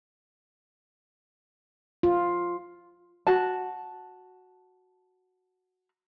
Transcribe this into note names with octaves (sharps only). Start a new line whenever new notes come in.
F4
F#4 A5